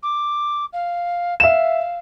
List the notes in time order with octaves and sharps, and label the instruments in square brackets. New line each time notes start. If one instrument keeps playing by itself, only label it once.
[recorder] D6
F5
[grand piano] E5 E7 [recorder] F5